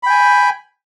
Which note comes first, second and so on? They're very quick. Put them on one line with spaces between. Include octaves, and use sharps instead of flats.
B5 G5 G#5